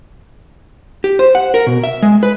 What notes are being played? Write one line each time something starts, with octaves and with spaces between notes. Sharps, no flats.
G4
C5
F#5
A#4
B2
E5
G#3
B4